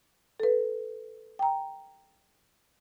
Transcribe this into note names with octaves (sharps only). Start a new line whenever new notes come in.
A4 B4
G5 A#5